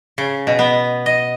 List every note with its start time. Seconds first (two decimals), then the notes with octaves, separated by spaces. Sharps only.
0.18 C#3
0.47 B2
0.59 B3
1.06 D#5